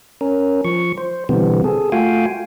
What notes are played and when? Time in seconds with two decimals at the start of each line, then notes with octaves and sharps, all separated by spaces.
0.21 C#4 A#4
0.65 F3 C#6
0.98 C5
1.29 B2 D3 E3 G3 B3 C4
1.64 G#4 A4
1.92 A3 F4 F#4 F5 G5 G#5